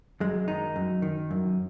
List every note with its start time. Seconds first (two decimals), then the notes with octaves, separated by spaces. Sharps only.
0.20 F#2 G#3
0.48 D#3 D#4
0.76 F#2
1.02 D#3
1.31 F#2